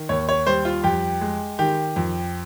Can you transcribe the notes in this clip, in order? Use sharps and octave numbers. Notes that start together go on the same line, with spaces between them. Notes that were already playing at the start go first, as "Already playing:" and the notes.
Already playing: D#3
D#2 C#5
C#5
G3 C5
F4
F2 G4
G#3
D#3 G4
F2